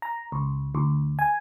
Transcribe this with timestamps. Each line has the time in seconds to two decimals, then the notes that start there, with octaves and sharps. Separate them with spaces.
0.02 A#5
0.32 C#2
0.75 D2
1.19 G#5